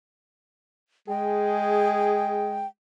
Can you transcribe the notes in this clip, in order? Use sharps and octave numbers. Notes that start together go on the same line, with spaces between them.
G#3 G#4 G5